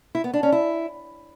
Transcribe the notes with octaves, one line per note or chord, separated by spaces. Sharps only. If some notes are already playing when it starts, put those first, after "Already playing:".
E4
B3
D4
C#4
E4